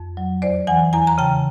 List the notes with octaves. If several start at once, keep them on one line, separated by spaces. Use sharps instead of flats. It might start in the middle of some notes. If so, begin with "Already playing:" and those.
Already playing: F2
F#3
E2 C5 D5
E3 F#5 G#5
E2 G#5 A#5
A#5
C#3 G5 A5